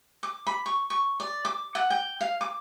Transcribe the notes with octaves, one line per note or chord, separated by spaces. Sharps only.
D6
B5
C#6
C#6
D5
D6
F#5
G5
F5
D6